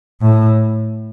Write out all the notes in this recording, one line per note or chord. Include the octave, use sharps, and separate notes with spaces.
A2